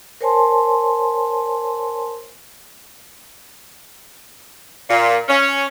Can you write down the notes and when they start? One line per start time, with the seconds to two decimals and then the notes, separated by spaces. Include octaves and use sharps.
0.21 A#4 C5 C#5 G#5 A5 C6
4.89 A#2
5.29 C#4